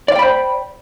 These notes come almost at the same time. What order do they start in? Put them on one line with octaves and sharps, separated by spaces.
D5 F5 G5 B5 C5